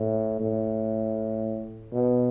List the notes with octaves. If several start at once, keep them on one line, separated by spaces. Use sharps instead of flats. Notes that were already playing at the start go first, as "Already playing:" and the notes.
Already playing: A2
A2
B2